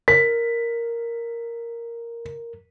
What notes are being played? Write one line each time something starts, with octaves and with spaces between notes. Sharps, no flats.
A#4 B6